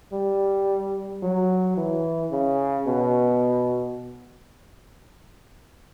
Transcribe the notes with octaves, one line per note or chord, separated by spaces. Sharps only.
G3
F#3
E3
C#3
B2